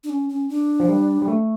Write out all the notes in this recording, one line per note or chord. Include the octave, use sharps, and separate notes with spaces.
D4
C#4
C#4
D4
F3
G3
G3
A3